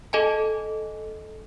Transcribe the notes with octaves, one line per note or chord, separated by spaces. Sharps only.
A4 D#5 G#5 A5